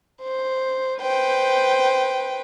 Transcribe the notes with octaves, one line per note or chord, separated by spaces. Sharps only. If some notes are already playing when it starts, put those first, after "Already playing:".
C5
B4 C5 G5